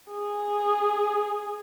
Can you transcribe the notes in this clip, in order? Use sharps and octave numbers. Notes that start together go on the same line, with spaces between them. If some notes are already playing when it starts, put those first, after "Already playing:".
G#4